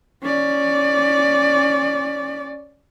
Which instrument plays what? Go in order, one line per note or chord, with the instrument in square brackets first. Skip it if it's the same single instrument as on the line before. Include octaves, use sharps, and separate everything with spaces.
[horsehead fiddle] C#4 D5